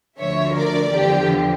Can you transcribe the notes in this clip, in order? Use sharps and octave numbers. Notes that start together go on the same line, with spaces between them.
D2 D3 F3 C#5 E5
A#4 D5
E2 D3 F3 G4